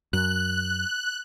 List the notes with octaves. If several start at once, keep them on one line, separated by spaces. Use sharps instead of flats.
F#2 F#6